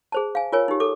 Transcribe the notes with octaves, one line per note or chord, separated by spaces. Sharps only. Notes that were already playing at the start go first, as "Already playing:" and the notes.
G#4 C5 A5
F5 G#5
F4 A#4 C#5 G#5
D#4 G4
A4 D6